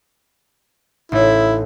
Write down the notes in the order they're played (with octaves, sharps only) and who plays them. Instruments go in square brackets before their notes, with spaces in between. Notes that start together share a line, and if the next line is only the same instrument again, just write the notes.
[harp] A1 D#4 [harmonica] E4